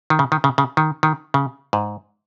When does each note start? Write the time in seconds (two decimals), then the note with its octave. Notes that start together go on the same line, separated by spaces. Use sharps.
0.10 D#3
0.19 C#3
0.32 D#3
0.44 C#3
0.58 C#3
0.77 D#3
1.03 D#3
1.34 C#3
1.73 G#2